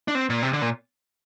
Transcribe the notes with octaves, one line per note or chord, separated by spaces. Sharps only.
D4
C4
A#2
C3
D3
A#2